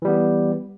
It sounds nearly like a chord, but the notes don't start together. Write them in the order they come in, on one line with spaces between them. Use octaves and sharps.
E3 G3 B3